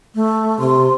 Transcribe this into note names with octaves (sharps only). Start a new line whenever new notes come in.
A3
C3 C6